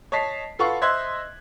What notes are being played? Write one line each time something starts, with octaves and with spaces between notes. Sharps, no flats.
C#5 D#5 A5 B6 C7
F4 A4 B4 F5 F#5 C#6
C5 D#5 E5 C6 F#6 G#6